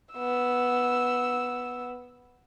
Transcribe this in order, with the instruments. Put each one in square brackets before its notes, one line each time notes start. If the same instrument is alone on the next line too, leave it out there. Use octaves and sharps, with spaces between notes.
[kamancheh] B3 E6